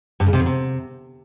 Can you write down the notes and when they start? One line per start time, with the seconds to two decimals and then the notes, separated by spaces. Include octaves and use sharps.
0.20 G2
0.27 C#3
0.33 C3
0.40 F2
0.46 C3